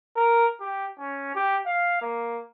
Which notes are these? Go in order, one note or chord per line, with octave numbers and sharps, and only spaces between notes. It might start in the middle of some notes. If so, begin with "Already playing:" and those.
A#4
G4
C#4
G4
F5
A#3